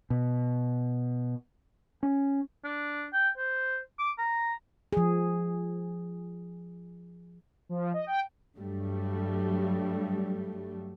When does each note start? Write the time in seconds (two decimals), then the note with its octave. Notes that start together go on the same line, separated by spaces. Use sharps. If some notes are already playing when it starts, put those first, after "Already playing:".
0.10 B2
2.03 C#4
2.64 D4
3.13 G5
3.37 C5
3.99 D6
4.18 A#5
4.93 F3 G#4
7.69 F3
7.94 D#5
8.07 G5
8.57 G2 F#3 G3 A3